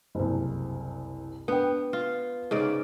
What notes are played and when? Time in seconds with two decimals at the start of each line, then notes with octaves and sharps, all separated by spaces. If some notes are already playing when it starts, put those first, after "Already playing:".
0.15 F#1 C2
1.48 B3 D4 B4 G5
1.93 F4
2.51 G#2 C#3 D5